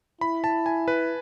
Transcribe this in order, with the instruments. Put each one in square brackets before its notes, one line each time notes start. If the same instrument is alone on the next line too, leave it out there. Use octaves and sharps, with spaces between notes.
[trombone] E4 [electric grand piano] B5
[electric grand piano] A5
G#5
B4